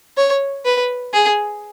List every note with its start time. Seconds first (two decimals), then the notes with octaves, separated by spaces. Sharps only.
0.17 C#5
0.65 B4
1.13 G#4